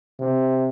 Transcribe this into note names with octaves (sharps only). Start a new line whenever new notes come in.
C3